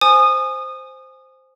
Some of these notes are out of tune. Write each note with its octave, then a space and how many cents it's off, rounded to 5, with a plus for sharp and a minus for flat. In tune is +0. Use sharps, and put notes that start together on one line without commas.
C5 +0 G#5 +0 D#6 -25